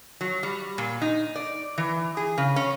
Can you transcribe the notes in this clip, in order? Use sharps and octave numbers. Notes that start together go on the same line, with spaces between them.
F#3
G3
A#2
D#4
D5
E3
G#4
C#3
C#4